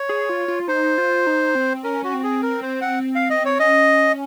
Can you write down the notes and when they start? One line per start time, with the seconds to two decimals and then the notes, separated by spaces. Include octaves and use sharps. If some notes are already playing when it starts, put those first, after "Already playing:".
Already playing: C#5
0.09 G#4
0.29 F4
0.48 F4
0.68 D#4 C5
0.98 F4
1.27 D#4
1.55 C4
1.84 C#4 A#4
2.04 F#4
2.14 C4
2.24 G#4
2.43 A#4
2.62 C5
2.82 F#5
3.15 F5
3.30 D#5
3.45 C#5
3.59 C#4 D#5